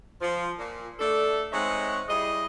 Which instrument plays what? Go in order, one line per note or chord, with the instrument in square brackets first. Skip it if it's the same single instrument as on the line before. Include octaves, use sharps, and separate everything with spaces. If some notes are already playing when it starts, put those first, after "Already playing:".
[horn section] F3
A#2
A3 D4 A4
G#3 C4 D#4 C#5 E5 F#5
G3 E4 G#4 D#5